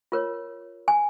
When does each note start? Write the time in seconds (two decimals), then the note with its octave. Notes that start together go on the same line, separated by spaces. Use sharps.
0.12 F4 A#4 C#5
0.88 G#5